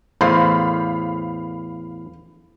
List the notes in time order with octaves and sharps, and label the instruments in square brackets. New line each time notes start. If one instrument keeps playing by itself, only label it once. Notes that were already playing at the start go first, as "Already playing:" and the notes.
[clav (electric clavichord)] E2 A2 C5 [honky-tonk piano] F5 B5